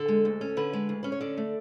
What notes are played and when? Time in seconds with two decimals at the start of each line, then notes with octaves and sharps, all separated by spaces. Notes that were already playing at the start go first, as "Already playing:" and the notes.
Already playing: D3 A4
0.08 G#3
0.25 D2
0.41 C#4
0.57 D3 B4
0.73 G#3
0.89 D2
1.03 C#4 B4
1.12 C#5
1.21 D3 D5
1.37 A3